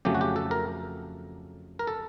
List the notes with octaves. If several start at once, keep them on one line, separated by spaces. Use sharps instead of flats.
F2 C#3 F#3 A3 C#4 G4
F#4
G4
A4
A#4
A#4
A4